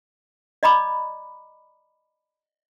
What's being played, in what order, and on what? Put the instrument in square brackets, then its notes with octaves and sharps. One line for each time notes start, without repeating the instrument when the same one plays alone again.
[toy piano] D5 D#5 A#5 B5 D6